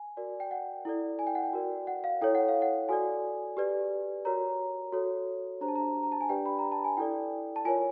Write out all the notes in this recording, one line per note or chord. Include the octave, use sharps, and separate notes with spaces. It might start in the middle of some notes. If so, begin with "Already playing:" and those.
Already playing: G#5
F#4 A#4 D5
G5
F#5
E4 A4 D5
G#5
G5
F#5
G5
F#4 A#4 D5
F#5
F5
E4 A4 C#5 G5
F#5
F5
F#5
F#4 A4 D5 G#5
G4 B4 D5
F#4 A#4 C#5 A#5
F#4 A4 C#5
D4 G4 C5 A#5
A5
A#5
A#5
A5
G#5
D4 G4 B4 D5 G5
B5
A#5
A5
G#5
E4 A4 D5 G5
A5
F4 A#4 C#5 G#5